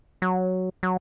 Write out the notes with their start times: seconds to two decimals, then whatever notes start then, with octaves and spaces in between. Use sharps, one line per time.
0.22 F#3
0.83 F#3